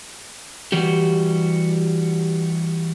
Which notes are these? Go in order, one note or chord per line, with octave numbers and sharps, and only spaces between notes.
E3 G3 F#4 G4